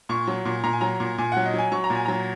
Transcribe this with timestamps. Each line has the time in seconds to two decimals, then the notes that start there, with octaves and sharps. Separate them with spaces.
0.09 A#2 C#6
0.27 F#3
0.45 A#2
0.63 A#2 A#5
0.73 G#5
0.81 F#3 A#5
1.00 A#2
1.18 A#2 G#5
1.32 F#3 F#5
1.45 D#5
1.54 F#3 G#5
1.72 F#3 C#6
1.84 A#5
1.90 A#2 G#5
2.05 F#3 A#5